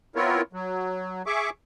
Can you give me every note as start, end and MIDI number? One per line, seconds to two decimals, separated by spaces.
0.16 0.41 59
0.16 0.41 60
0.16 0.41 64
0.16 0.41 65
0.16 0.41 70
0.16 0.41 73
0.53 1.22 54
1.26 1.50 68
1.26 1.50 76
1.26 1.50 85
1.26 1.50 86